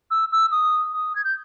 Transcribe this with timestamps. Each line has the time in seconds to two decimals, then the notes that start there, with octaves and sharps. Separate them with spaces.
0.11 E6
0.32 E6
0.52 D#6
0.93 D#6
1.16 G#6
1.24 G6